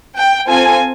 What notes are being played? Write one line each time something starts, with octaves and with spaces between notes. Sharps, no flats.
G5
C4 F4 A4 G#5